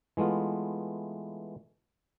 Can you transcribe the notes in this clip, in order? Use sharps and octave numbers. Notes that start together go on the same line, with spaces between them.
E3 G#3 A3 B3 F4